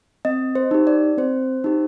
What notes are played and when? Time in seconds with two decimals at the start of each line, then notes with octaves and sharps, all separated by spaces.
0.25 C4 D#5
0.55 C5
0.71 D#4 G4
0.87 D5
1.18 C4 C5
1.64 D#4 G4